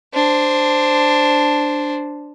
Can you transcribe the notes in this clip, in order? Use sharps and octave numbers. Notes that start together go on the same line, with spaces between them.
D4 C5